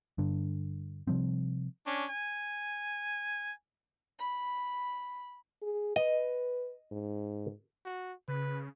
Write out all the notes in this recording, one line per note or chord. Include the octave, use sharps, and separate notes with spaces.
G2 D3
C3 F3 G3 C4
C#4 D4
G#5
B5
G#4
B4 D#5
G#2
F#4
C#3 B4